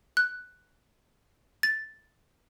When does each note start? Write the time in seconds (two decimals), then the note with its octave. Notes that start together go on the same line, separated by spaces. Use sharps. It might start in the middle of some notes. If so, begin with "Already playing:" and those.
0.17 F#6
1.63 A6